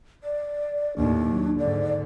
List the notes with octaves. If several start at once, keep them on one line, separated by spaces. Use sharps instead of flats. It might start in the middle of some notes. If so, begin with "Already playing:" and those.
D5
D#2 A2 D4
F#3
G#2 D3 D5